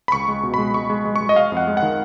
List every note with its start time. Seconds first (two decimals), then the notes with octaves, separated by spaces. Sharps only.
0.08 B5
0.12 C#2 C#6
0.28 G#3
0.43 B2
0.54 G#3 B5
0.74 G#3 C#6
0.90 G#3
1.05 G#3
1.16 C#6
1.21 G#3
1.29 D#5
1.36 G#3 F5
1.52 F2 F#5
1.67 G#3
1.77 F#5
1.82 D#3